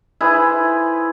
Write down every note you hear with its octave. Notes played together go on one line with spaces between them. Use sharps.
E4 G#4 B4 C5